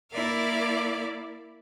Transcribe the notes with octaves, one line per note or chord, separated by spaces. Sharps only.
A#3 E4 A#4 D5 E5 F5